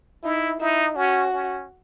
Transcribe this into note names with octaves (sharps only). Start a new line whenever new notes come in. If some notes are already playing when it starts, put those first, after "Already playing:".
D#4 E4
D#4 E4
C#4 F#4
C#4